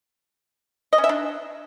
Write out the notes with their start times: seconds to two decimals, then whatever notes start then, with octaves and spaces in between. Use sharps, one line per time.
0.93 D#5
0.98 C#4
1.04 E5
1.09 D4